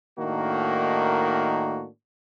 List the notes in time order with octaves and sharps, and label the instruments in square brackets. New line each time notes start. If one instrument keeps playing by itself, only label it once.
[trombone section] A2 D#3 A#3 D4 D#4 F#4